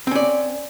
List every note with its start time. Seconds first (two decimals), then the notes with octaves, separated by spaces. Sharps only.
0.07 C4
0.11 C#4
0.15 D5